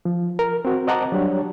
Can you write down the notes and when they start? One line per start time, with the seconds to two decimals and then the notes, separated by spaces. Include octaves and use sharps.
0.05 F3
0.39 A#4
0.65 C4 F#4
0.87 C5 D#5 F#5 A5 A#5 D6
1.12 F#3 G3 D4 G4 C#5